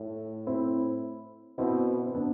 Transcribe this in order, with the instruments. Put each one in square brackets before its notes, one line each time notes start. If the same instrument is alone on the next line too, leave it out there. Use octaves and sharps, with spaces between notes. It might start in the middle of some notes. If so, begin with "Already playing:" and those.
Already playing: [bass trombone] A2
[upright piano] C4 E4
[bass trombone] B2 [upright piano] C4 E4
[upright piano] C4
B3 D4